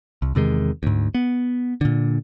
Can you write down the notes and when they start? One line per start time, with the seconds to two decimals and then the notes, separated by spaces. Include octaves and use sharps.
0.22 C2
0.35 E2 C3 D#3 G#3
0.83 D2 G#2
1.15 B3
1.81 A#2 D3